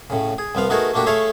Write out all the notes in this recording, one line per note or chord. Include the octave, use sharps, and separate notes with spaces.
A2 C#3
G#4
C2 F3 B3 F5
A3 B3 D#4 F#4 G#4 A#4
A3 A#3 D4 F#4 G4
A3 G#4 A4 C#5 E5 F5